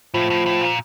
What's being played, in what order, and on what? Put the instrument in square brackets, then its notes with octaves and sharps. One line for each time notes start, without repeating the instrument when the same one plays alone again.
[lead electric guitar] A2 [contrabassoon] F3
[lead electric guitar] A2
A2
A#2